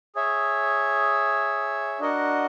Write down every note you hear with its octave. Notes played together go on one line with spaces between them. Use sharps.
G#4 C#5 E5
D4 F#4 A#4 D#5 F#5